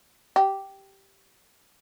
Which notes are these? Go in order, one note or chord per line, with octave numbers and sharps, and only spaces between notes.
G4